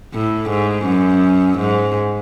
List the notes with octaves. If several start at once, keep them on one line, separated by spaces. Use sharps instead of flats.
A2
G#2
F#2
G#2